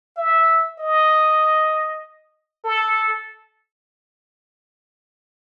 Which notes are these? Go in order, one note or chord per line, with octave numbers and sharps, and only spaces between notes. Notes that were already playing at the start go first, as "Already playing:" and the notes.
E5
D#5
A4